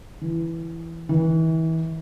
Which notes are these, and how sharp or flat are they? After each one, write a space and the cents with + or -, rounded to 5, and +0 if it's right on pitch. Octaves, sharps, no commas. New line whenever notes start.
E3 +5
E3 -30